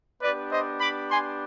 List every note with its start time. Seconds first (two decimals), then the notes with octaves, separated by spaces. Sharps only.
0.21 B3 D4 G4 B4 D5
0.50 C5 D#5
0.80 B5 D6
1.09 G#5 C6